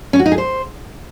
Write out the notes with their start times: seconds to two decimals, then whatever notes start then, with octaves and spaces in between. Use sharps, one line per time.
0.13 C#4
0.19 F#4
0.26 D#4
0.32 G#4
0.38 C5